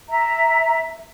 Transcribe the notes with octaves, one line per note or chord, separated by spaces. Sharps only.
E5 A#5